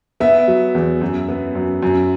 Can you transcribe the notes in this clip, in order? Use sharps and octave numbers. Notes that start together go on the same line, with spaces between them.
B3 E5
F#3
E2
F#2
B3
F#2
F#2